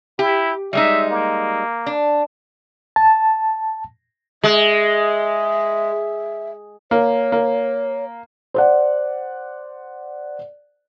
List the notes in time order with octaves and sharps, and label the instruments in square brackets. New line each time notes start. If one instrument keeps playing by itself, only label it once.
[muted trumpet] E4 [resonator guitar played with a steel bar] G4
[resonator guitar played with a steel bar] G3 G#3 D#4 [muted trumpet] E5
[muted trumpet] A#3
[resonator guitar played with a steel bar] D4
[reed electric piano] A5
[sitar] G#3 [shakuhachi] E5
[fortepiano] A#3 [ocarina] C#5
[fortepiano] A#3
[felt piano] C5 D5 F#5